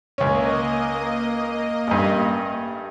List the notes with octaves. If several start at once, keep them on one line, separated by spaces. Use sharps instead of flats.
C#2 A#3 C#4 D#5
A1 G2